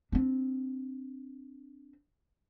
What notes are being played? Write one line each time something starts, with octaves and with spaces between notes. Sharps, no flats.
C4 D4